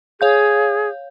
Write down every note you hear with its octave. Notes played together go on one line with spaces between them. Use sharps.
G#4 C#5 F5 G6